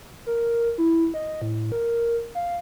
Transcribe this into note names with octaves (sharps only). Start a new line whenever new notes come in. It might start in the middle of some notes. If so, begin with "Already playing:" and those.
A#4
E4
D#5
A2
A#4
F5